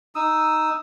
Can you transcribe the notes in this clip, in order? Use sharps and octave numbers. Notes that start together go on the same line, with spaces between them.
D#4 D#6 E6